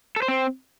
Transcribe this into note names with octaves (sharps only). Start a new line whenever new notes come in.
A4
C5
C4